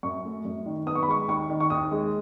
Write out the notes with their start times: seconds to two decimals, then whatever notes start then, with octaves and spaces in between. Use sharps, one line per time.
0.03 F#2 C#6
0.25 A3
0.45 F#2
0.66 D#3
0.86 B3 D#6
0.95 C#6
1.03 B5
1.08 G#3 C#6
1.28 D#2 C#6
1.50 D#3
1.60 C#6
1.70 D#2 D#6
1.91 G#3